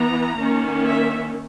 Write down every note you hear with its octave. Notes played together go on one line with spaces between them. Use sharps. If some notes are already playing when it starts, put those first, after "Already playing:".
Already playing: E3 B3 A#5
D#3 A#3 C#4
E5